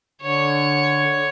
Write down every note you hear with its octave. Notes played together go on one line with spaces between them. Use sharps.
D3 C#5